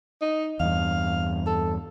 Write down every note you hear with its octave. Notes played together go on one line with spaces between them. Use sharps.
D#4
E2 G2 F5
A4